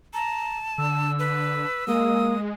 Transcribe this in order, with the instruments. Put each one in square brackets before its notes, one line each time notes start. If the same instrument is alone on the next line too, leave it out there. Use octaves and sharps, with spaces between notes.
[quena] A5 [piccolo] A#5
[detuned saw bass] D3 [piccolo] E6
[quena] B4
[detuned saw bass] G#3 [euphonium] A#3 [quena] D#6